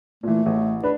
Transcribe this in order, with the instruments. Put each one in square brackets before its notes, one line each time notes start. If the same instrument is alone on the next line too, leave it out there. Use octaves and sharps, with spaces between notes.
[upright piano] A#2 E3 [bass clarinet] A3
[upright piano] A1
[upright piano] D4 [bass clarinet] B4